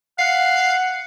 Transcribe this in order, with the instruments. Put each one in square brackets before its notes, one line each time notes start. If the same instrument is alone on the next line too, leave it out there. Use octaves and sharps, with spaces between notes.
[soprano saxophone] F5 [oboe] F#5